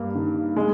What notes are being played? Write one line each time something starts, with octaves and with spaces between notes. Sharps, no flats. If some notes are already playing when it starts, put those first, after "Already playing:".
Already playing: G2 A#3
D#3
G#3